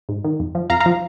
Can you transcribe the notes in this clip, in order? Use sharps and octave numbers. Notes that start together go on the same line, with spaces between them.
G#2
D#3
F2
F3
F2 F5 A#5
F5 A#5
F3